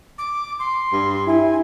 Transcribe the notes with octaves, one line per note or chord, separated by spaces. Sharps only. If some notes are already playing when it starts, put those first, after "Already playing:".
D6
C6
G2
E4 G#5